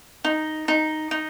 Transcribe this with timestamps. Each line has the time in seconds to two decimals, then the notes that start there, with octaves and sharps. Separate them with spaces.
0.25 D#4
0.68 D#4
1.11 D#4